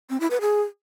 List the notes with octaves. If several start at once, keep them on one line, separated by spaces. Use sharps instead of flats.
C4
E4
B4
G#4